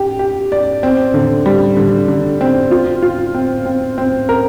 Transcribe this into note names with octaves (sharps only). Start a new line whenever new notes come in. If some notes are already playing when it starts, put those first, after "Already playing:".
Already playing: G4
G4
D5
C4
D3
G3
D3
D3
C4
F4
F4
C4
C4
C4
A#4